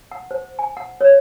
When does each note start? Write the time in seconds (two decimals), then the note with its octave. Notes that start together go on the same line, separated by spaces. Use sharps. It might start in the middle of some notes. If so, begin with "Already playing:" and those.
0.11 F#5
0.31 C5
0.59 G#5
0.77 F#5
1.01 C#5